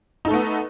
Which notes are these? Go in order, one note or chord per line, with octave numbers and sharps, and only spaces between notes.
A3 B3 D#4 A4 B4